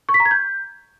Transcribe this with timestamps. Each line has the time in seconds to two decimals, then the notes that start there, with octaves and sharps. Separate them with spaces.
0.09 C#6
0.14 B6
0.20 A#5
0.25 G#6
0.31 G6